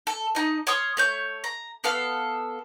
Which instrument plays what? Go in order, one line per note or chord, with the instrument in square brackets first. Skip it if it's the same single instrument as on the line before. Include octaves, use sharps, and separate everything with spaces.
[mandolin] A4
D#4 D#5
C#5 C6 D#6 F6
A3 C#5 G6
A#5
B3 A4 F5 F6